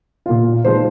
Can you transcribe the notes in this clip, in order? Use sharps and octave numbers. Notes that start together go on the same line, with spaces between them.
A#2 A#3 F4
F3 G#3 D#4 C5